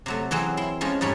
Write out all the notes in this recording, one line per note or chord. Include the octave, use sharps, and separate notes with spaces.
C3 F#3 A3
E3 F#3 C4 G#4
E4 C6
F3 G#3 C#4
F2 G#2 G3 C#5 B5